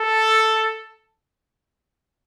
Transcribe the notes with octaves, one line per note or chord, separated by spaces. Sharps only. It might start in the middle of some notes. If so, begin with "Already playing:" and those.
Already playing: A4